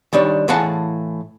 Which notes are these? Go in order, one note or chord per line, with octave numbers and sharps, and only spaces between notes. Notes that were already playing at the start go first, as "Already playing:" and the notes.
D#3 G3 D4 C#5
A2 E3 G#4 F5 F#5 A5